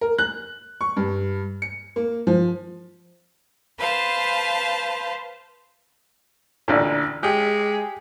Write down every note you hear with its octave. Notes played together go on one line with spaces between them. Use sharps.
A#4
F#6
C#6
G2
C#7
A#3
F3
B4 C5 F5 A5
A1 D2 A#2
G#3 G4